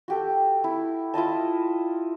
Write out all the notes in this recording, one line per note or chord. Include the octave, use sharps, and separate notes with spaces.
F#4 G4 A4
E4
E4 F4 D#5 A5